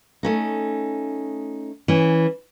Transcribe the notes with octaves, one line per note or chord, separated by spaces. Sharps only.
A3 C#4 D#4
E3 C#4